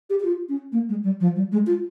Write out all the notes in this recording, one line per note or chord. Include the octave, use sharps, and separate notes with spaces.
G4
G4
F4
C#4
A#3
G#3
G3
F3
G3
G#3
F4